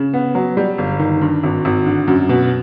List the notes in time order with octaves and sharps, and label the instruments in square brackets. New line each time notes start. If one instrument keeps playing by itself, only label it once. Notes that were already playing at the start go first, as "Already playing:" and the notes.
Already playing: [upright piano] C#3
B3
F#3
G3
G1
D#3
G2
G#1
G#1
D3
F#2
B2